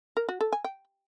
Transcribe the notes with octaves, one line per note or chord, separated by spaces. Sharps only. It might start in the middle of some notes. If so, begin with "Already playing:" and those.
A#4
F#4
A4
G#5
G5